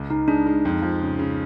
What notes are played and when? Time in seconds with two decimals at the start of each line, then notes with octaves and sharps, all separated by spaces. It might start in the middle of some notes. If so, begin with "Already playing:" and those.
Already playing: C#2
0.10 C#2 D#4
0.28 G#3 D4
0.46 G#3 D#4
0.65 F2
0.82 F3
1.01 C#3
1.19 C#3